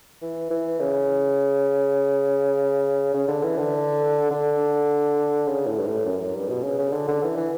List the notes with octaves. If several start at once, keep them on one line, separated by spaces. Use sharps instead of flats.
E3
E3
C#3
C#3
D3
E3
D3
D3
C#3
A2
G2
A2
F#2
F#2
G2
B2
C#3
C#3
D3
D3
E3
E3